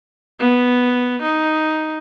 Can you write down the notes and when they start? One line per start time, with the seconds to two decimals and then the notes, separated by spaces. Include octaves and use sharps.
0.39 B3
1.23 D#4